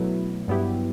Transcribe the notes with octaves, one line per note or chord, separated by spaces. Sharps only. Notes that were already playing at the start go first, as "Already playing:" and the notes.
Already playing: B2 F#3 A3 E4 B4
G2 F#3 B3 E4 G4